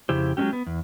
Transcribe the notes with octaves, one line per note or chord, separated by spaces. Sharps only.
F2 C#3 E4 G4 C5
F#3 G#3 C4 C#4 G4
B3
E2